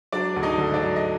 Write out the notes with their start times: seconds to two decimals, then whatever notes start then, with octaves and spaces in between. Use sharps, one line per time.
0.12 F#3 D4 D5
0.36 D2
0.43 D#4 D#5
0.58 D3
0.74 D4 D5
0.81 F#3
0.96 D#5